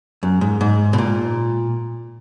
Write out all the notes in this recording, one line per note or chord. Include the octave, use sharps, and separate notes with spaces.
F#2
G#2
G#2
B2
A#2